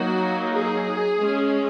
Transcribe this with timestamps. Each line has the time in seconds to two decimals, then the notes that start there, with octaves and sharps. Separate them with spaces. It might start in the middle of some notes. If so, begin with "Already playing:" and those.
Already playing: F#3 A#3 D#4 F#4
0.55 G#4
1.19 G#3 C#4